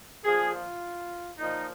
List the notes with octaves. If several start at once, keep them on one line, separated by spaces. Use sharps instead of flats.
A#2 F3 G#4
F4
A#2 F3 D#4